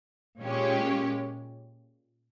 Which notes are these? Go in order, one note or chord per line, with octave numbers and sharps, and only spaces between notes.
A#2 G#3 C#4 G4 C#5